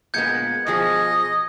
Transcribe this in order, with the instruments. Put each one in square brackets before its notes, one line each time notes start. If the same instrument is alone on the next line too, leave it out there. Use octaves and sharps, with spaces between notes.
[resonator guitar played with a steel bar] A#2 G#3 B3 [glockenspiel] G6 G#6 C#7
[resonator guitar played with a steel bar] B2 F3 G#4 [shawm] D#5